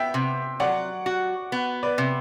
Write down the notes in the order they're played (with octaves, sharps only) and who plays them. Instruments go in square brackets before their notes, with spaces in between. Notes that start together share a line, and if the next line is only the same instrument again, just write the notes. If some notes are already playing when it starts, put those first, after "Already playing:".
Already playing: [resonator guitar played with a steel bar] B3 [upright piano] E5 G5
[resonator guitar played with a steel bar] C3
[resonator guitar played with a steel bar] F#3 [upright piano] D5 F#5
[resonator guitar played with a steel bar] F#4
B3
[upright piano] B4 D5
[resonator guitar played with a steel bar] C3